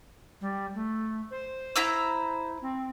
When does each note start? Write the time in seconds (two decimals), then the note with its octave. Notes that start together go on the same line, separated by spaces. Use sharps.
0.40 G3
0.74 A3
1.31 C5
1.76 E4 A#5 E6
2.61 C4